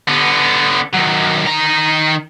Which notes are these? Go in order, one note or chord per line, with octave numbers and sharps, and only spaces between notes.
D3 B3
D#3 F#3
D#3 A#5